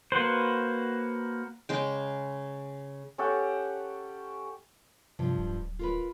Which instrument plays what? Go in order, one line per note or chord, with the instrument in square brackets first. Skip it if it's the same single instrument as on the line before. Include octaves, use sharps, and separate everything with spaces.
[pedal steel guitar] A#3 F#4 B4 C5
[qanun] C#3 G#3 G5
[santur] C#4 G4 A4 F#5
[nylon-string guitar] G2 F3 [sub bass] C3
[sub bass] D1
[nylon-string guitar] F4 A#4 B4